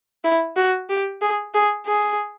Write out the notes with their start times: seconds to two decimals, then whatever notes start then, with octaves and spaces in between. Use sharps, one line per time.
0.24 E4
0.57 F#4
0.89 G4
1.22 G#4
1.54 G#4
1.86 G#4